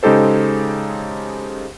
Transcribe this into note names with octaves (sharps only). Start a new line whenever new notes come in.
C#3 G#3 D#4 G4 A4 C5